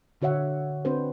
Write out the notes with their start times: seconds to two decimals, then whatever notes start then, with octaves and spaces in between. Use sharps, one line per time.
0.21 A#2 D3 F#4 C#5 E5 F#5
0.85 C4 D4 F#4 B4 C5